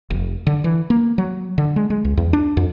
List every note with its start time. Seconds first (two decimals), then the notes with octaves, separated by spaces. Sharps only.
0.10 F1
0.47 D3
0.64 E3
0.90 A#3
1.18 F#3
1.58 D3
1.76 G#3
1.90 G#3
2.05 C#2
2.17 E2
2.33 D4
2.57 F2